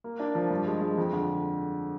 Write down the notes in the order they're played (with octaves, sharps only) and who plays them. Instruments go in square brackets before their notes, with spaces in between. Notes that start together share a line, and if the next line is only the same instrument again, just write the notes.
[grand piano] A#3
D4
F3
G2
G#3
G#3
F2
D3